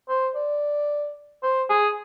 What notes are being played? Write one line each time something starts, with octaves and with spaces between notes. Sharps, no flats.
C5
D5
C5
G#4